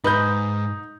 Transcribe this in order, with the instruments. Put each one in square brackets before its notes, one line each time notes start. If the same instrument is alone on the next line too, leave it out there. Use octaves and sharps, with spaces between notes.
[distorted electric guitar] G#2 [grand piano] D#4 G6 [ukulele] B4